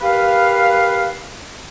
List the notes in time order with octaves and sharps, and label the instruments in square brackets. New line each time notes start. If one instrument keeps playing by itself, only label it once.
[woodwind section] G4 A#4 B4 F5